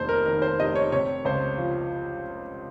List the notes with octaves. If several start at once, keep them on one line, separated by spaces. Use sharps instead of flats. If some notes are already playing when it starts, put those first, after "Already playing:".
Already playing: F1 D#2 C5
A#4
D#3 A#4
C5
F1 D#5
C#5
C3 C#5
C#2 C5
F3